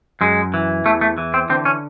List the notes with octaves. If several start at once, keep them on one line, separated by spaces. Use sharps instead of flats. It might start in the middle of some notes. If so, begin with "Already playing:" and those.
F#2 G#3
E3
E2 A3
A3
E3
C4
D3 C4
C#4